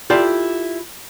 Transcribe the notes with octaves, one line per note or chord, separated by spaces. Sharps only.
E4 F4 G4 A4 D5 F5